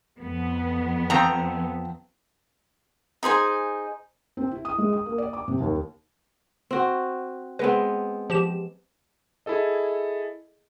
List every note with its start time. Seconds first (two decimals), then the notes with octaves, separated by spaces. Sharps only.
0.18 F2 B3
1.10 F3 C4 A#5
3.23 D#4 G#4 C5 G#5
4.37 C4
4.51 E4
4.65 D#6
4.78 G#3
4.93 D#6
5.06 A#3
5.18 D5
5.33 D6
5.48 C3
5.61 D#2
6.71 C4 F#4
7.59 G#3 B3 C4 B4
8.30 F3 G4 E7
9.46 E4 G#4 A4 D#5